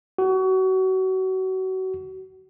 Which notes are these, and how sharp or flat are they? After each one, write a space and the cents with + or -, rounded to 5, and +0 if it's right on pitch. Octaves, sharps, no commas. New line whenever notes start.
F#4 +30